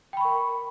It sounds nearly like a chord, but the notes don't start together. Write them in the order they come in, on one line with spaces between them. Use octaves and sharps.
G5 B5 C#6 A#4